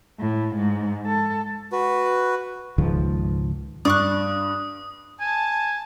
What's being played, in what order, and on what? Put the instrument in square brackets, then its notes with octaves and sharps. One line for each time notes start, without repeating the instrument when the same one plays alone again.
[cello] A2
G#2
A4
[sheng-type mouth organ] F#4 B4
[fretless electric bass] C#2 G#2 D#3 F3
[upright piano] G2 [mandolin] D5 C#6 F#6 [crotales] D#6
[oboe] G#5 [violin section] A5